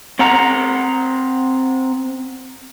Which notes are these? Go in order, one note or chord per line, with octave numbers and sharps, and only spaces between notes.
C4 F#5 A#5